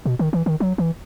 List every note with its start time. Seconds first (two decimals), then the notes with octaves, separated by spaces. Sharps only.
0.06 B2
0.19 D#3
0.33 E3
0.46 D#3
0.60 F#3
0.78 E3